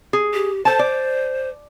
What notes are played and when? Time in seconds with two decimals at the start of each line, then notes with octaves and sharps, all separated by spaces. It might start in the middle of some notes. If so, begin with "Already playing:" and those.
0.13 G#4
0.34 G4
0.65 A4 C5 A5
0.79 D5